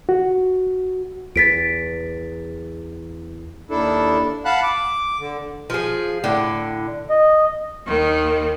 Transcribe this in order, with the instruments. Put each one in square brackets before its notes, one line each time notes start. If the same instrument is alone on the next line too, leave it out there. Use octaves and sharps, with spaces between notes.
[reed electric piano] F#4
[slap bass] E2 [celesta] A6 B6 D7
[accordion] D#2 D4 E4 A4
F5 F#5 A5 B5 F#6
D6
D3
[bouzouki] F3 G#4
A2 D3
[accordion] D#5
[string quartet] D#2 D#3